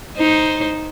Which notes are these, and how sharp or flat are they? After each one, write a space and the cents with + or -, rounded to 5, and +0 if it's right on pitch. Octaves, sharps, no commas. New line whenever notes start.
D#4 +0 C5 +0